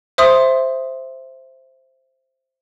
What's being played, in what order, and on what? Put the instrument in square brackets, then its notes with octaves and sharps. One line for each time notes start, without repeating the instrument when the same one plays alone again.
[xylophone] C5 E5 C6 D#6